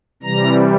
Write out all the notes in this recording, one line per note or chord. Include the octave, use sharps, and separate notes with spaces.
C3 E3 G3 A#5